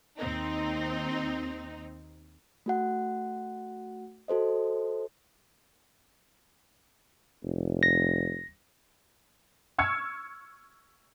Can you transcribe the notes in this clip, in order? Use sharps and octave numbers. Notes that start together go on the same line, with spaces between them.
D#2 C4 D#4
A3 F#4 F#5
F#4 A4 C5 D#5
F1
A#6
C#6 E6 F6 G#6 C#7